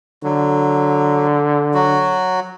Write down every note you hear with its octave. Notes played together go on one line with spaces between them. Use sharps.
D3 F#3
F#3 F#4